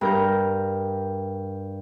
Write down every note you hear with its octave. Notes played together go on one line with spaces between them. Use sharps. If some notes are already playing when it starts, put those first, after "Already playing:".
G2 A#4 G6